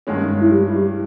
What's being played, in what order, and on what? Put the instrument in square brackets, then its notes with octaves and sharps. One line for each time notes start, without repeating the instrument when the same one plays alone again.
[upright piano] G2 D#3 G#3 C#4
[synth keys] E4
G3 G4
E4
G3 G4